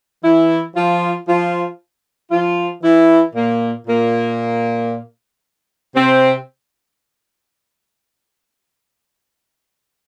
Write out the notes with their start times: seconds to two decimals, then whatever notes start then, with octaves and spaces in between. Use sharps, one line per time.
0.23 E3 E4
0.75 F3 F4
1.28 F3 F4
2.31 F3 F4
2.83 E3 E4
3.35 A#2 A#3
3.87 A#2 A#3
5.95 C3 C4